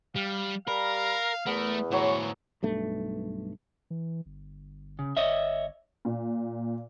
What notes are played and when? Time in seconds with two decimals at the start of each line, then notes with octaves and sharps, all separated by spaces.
0.16 G3 F5
0.67 G3 A#4 F5 B5
1.47 E2 A3 B3 A#4
1.92 A2 E3 F#3 C4 C#5 C#6
2.63 B1 G2 A3
3.90 E3
4.26 G1
4.99 C#3
5.17 G1 C#5 D#5 E5
6.05 A#2